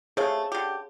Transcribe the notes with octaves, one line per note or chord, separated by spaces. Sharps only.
C3 A3 G#4 C#5 F5
D3 G4